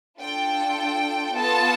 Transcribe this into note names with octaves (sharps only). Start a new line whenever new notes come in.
D4 F4 A4 G5
B3 F4 A4 A5